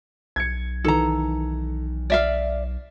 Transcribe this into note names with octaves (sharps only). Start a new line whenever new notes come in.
B1 G#6 C#7
D#3 E3 A4 A#5
D5 E5 F5